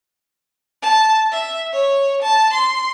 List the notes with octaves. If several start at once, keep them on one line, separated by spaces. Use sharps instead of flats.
A5
E5
C#5
A5
C6